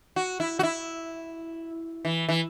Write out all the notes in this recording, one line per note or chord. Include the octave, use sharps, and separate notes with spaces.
F#4
E4
F#4
E4
E3
E3